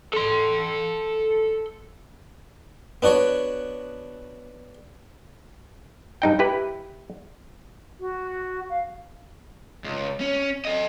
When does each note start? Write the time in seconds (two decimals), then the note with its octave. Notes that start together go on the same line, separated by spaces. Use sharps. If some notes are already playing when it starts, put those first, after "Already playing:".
0.13 A4 C6
3.02 B3 D4 F#4 C#5
6.22 G2 D#4 G5
6.39 E4 G4 B4
8.00 F#4
8.69 F5
9.84 C#2
10.20 C#4
10.65 A4 D#5